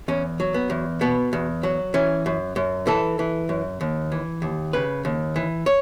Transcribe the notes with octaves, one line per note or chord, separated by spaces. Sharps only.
E2 C#4
F#3
B3
E2
B2 B3
E2
F#3
E3 C#4
F#2
F#2
E3 A4
E3
F#2
D#2
E3
D#2
C#3 B4
D#2
E3
C#5